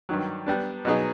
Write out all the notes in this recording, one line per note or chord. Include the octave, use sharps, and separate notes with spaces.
G2 D#3 F#3
G3 B3 D4
B2 F#3 B3 D#4 G#4